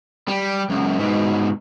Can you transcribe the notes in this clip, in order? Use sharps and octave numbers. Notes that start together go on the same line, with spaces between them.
G3
C#2 F#2
G#2 B2